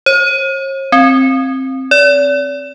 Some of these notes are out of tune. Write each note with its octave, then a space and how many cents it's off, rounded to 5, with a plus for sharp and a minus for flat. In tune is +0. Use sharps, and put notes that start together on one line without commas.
C#5 -45
C4 +15
D5 -40